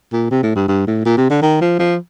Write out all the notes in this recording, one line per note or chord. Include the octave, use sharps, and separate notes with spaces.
A#2
C3
A2
G2
G2
A2
A#2
C3
D3
D#3
F3
F3